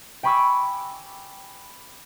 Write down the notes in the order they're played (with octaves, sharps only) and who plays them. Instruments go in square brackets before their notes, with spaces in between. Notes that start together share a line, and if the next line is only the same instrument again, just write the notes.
[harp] G5 G#5 B5 C#6 D6 E6